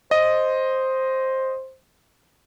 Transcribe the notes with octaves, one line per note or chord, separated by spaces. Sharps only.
C5 D#5